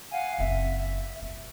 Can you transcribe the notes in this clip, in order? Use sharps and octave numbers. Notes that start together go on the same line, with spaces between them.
F5 F#5 G#5
F#1 C4 E5
A#2